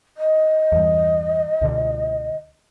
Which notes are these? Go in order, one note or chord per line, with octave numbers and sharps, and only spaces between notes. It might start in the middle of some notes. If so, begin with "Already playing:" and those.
D#5
E2 G2
C#2 B2 D3